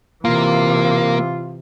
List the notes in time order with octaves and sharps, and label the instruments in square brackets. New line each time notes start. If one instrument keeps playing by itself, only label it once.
[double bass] C3 E3 [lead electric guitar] A#3 [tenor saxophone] F4